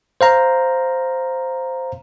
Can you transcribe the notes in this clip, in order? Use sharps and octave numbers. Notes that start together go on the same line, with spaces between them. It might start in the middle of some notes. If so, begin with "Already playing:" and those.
C5 F5 A#5